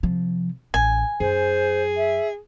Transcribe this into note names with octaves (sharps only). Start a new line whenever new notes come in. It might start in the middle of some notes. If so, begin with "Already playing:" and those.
C3 F3
A1 G#5
F#2 G#4 C5
E5